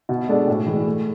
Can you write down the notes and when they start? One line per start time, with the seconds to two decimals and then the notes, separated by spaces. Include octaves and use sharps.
0.09 B2
0.28 G#3 D4 A4 D5
0.48 A2
0.67 E3 G#3
0.86 A3